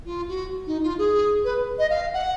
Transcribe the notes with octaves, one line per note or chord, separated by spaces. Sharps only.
F4
F#4
D#4
F4
G#4
B4
D#5
F5
F#5